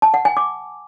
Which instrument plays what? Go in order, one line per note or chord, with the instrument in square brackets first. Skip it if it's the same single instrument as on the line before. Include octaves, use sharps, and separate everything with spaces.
[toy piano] A5
F#5
G#5
D6